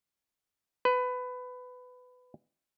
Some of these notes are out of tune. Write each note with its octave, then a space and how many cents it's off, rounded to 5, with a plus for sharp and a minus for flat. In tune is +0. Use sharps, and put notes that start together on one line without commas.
B4 +20